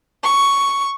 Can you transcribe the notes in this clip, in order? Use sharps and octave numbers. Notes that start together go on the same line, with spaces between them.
C#6